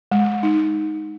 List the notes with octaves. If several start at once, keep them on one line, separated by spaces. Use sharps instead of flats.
G#3
D#4